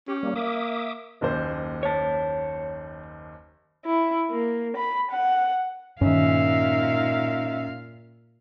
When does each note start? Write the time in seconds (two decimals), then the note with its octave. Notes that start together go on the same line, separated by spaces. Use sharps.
0.08 C#4 G4
0.23 G3 A#3
0.36 A#3 E5 D6 D#6
1.21 F#1 D#2 C5
1.83 C#5 A5
3.85 E4
4.30 A#3
4.77 B5
5.11 F#5
6.01 G2 A#2 D#3 C#4 D#4 E5 F5